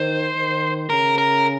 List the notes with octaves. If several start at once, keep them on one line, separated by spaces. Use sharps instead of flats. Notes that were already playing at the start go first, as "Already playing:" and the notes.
Already playing: D#3 C5
D#3
C#3 A#4
A#4